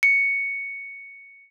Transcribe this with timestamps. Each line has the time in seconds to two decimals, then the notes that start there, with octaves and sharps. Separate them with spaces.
0.03 C#7